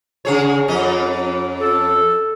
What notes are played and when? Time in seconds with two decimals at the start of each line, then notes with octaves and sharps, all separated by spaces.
0.25 C#3 G#4 C#5
0.68 F2 C#4 D#5
1.61 A4